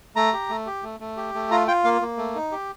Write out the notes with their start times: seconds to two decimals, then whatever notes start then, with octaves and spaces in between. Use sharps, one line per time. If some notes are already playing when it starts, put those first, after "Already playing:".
0.16 A3 A#5
0.33 G4
0.50 A3
0.66 G4
0.83 A3
1.00 A3
1.17 G4
1.34 A3
1.51 F4 A#5
1.68 F4 G5
1.84 A#3 F5
2.01 A#3
2.18 A3
2.35 D#4
2.52 G4